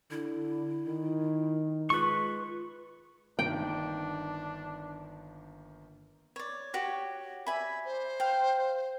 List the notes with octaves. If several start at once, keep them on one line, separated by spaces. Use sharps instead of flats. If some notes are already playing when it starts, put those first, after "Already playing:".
D3 E4
D#3
G#3 F4 B4 C#6
G1 D#3 A#3 D4 G5
C#5 D5
F#4 G4 C#5
D5 E5 G#5 B5
C5
F5 G5